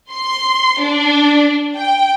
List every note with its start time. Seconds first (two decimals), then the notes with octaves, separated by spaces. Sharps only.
0.12 C6
0.83 D4
1.76 G5